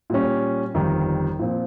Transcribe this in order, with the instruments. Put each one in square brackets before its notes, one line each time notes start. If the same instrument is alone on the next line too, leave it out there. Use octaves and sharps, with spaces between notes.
[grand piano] A#2 G3 C#4
G1 F2 D#3 G3
A#2 F3 C4